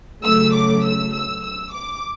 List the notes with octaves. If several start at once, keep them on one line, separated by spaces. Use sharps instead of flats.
C#3 F#3 A3 E6
D6
E6
E6
E6
D6